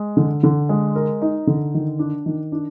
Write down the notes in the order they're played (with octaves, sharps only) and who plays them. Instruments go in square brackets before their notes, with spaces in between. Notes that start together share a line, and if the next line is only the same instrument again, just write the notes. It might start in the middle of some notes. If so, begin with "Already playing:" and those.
Already playing: [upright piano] G#3
D3
D3
G#3
A#4
D#4
D3
D#3
D4
D#3
D4